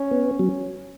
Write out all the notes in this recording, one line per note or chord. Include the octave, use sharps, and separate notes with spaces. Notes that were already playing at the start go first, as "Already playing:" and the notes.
Already playing: C#4
B3
F#3